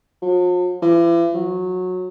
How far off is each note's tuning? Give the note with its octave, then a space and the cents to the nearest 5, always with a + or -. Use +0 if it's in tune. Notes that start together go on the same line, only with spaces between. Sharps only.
F3 +45
E3 +40
F#3 -15